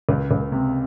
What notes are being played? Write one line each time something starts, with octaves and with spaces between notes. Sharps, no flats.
C#2
C#2
C3